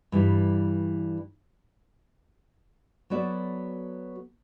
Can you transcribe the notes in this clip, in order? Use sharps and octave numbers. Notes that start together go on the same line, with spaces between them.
G2 E3 G3
F#3 B3 F#4 A4 D5